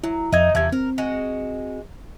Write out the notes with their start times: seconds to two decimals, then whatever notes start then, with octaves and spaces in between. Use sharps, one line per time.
0.04 F#3 E4
0.32 F2 D#4 D#5 E5 G#6
0.55 E2 C3 F3 E5 G#6
0.72 C4 A#4
0.98 G#3 F#4